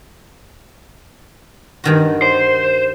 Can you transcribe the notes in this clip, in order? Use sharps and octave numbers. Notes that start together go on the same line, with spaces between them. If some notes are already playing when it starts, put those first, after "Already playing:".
G2 D#3 F#4
C5